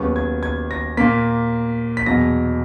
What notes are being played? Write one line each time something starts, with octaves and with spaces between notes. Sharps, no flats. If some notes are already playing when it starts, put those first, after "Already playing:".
Already playing: D#2 C#3 F#3 B3 C#6
G#6
G#6
A#6
A#2 A#3 B6
B6
E2 B2 F#3 A#6